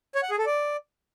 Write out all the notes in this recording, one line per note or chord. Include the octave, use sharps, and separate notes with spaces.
C#5
F#5
G#4
A4
D5